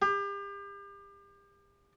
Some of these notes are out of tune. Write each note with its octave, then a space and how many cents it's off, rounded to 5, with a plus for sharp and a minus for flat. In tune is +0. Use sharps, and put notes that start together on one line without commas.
G4 +35